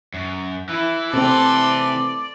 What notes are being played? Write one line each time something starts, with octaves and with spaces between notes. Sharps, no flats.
F#2
E3 E4
C3 A3 C4 A4 D5 C6